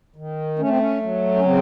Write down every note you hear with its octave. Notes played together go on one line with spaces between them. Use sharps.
D#3
A3 C#4
C4
C#4
F#3
C#4
C#3 C4